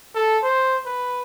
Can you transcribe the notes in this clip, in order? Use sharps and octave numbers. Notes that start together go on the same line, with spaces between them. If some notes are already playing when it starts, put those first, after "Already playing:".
A4
C5
B4